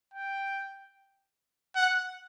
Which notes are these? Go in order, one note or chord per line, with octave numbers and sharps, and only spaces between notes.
G5
F#5